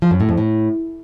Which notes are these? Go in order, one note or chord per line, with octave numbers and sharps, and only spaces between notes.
F3
F#2
A2
F2
A2